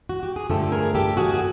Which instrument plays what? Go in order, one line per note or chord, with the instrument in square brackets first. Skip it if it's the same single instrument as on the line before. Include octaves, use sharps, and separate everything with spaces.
[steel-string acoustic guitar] F#4
G4
G#4
G2 D3 F3 A3 G4 A4
G#4 A#4
G4 A4
F#4 G#4
G#4